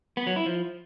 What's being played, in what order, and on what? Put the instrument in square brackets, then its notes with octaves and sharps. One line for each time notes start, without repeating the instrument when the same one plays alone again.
[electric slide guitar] B3
F#3
E4
F3